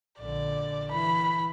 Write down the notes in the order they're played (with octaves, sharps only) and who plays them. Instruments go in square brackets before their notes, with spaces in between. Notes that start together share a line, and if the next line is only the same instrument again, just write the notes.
[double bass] A#1 D3 [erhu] D5
[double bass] E3 [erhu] B5